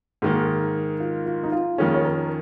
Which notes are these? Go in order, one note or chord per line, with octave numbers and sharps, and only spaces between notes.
G#2 D#3 A#3 G#4
F4
F4
D#4
F4
F2 D#3 A#3 C#4 G#4
C#5
A#4